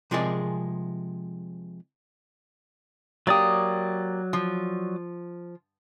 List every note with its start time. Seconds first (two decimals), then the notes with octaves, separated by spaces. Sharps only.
0.11 C3 F3 G#3 G#4 A#4 D5
3.27 F#3 A#3 G4 D5 D#6
4.33 F3